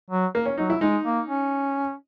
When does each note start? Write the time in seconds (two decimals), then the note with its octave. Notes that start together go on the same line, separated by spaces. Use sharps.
0.10 F#3
0.35 A#3
0.46 C#4
0.58 F#3 D#4
0.70 E4
0.81 G#3 D#4
1.04 A#3
1.27 C#4